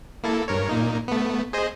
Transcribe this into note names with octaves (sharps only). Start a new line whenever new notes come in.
A#3 E4 A4
G2 A#4 C#5
A#2 A#3 D#4
A3 B3
G#4 C5 D#5